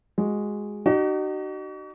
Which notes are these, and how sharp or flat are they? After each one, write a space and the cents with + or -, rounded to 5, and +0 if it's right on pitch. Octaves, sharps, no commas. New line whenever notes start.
G#3 +0 F#4 +0
D#4 -35 F#4 +40